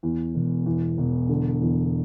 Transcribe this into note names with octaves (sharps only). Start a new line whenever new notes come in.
E2
E1
E2
E1
D3
E2